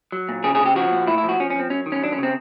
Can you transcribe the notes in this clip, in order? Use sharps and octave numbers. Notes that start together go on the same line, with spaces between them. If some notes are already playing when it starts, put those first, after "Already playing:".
F#3
A#2
C#3 G#4
G#4
C#3 G4
F3 F#4
A#2
A2 E4
E4
F3 F#4
F3 C#4
C#4
F3 C4
F#3 C#4
D#3
C#4
F#3 D4
C#4
C#3 C4